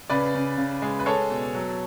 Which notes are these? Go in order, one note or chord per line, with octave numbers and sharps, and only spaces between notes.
C#3 B4 D5
C#3
C#3
G#3
B4
G#3 A4 C#5
B2
F#3